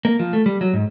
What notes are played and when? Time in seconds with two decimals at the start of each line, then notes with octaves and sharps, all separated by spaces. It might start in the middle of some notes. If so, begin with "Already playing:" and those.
0.05 A#3
0.19 F3
0.33 A3
0.46 G3
0.61 F#3
0.73 G#2